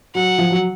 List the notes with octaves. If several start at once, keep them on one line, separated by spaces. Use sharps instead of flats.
F#3 F#5
F3
F#3